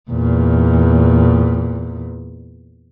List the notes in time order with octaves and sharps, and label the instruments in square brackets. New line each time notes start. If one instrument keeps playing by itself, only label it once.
[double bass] E2 A#2